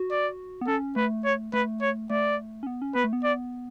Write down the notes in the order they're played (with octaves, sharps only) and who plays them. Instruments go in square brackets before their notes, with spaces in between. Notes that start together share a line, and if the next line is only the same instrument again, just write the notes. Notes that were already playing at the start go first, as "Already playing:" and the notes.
Already playing: [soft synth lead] F#4
[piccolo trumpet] D5
[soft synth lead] B3
[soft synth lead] C#4 [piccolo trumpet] A4
[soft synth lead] A3 [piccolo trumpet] B4
[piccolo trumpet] C#5
[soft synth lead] A3 [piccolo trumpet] B4
[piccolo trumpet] C#5
[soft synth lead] A3 [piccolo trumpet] D5
[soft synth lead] C#4
B3
C#4
[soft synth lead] B3 [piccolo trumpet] B4
[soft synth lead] A3
B3
[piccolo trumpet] D5